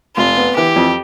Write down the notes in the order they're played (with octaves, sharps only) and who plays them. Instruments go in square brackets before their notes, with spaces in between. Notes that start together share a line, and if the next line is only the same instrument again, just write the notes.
[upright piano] F1 [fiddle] F4
[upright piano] B3
[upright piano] E3 [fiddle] G4
[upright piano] F2